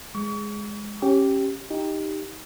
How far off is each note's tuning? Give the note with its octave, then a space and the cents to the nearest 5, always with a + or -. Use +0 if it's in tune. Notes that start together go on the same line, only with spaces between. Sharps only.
G#3 +0 C#6 +35
C#4 -20 G4 -10
D#4 +10 G4 +5